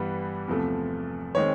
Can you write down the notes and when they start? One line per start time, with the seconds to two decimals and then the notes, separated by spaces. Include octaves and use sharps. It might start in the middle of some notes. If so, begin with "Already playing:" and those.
Already playing: G2 E3 G3 B3
0.48 E2 C3 F3 A3
1.35 D#3 G#3 C4 C#5